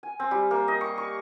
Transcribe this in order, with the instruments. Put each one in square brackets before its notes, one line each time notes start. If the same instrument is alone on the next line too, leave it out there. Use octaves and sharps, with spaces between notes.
[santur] G#5
C4
G3
A#3
D#5
C#6
C#6